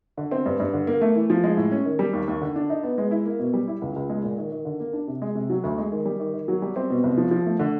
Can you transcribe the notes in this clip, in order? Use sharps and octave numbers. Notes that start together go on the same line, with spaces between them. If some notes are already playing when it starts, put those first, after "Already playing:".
D3
C4
G2
G2
D3
A#3
A3
E3
F3
G#3
A2
C#4
D#3
G3
D#2
D#2
D3
D4
D#4
B3
G#3
E4
A#3
B2
G3
E4
C#2
C#2
G#3
A#2
D#3
D#3
D3
A#3
D4
C3
G#3
C3
F#3
D2
G#3
D#3
G3
D#3
D#3
F#3
G3
C4
B2
C2
F3
F3
A3
D3